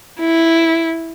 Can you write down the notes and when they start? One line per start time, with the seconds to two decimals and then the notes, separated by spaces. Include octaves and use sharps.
0.19 E4